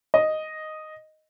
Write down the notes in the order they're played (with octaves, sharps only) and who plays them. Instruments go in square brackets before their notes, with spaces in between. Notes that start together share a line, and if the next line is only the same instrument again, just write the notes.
[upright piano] D#5